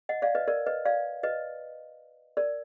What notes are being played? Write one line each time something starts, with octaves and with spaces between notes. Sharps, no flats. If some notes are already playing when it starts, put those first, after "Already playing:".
D#5 F#5
D5 F5
B4 D#5
A#4 D5
B4 D#5
D5 F5
B4 D#5
A#4 D5